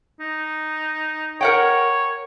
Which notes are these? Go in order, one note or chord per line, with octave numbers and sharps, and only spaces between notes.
D#4
A#4 C#5 F#5 G5